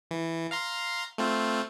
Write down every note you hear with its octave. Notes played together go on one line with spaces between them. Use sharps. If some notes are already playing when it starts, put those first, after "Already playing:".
E3
F5 A#5 C6
A3 C4 F4